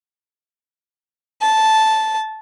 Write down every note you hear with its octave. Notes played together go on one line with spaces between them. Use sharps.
A5